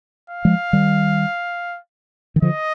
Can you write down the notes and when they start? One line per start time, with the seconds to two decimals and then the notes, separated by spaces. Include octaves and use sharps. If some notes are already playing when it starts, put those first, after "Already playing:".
0.30 F5
0.45 F3 G#3
0.73 D#3 G3
2.36 D#3
2.42 D3 F3 D#5